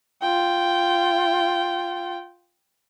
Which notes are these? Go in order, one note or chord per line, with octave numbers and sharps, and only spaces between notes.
F4 G5